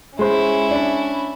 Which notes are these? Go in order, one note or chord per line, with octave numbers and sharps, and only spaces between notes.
G#3 C#4 E4 C5
D4 B5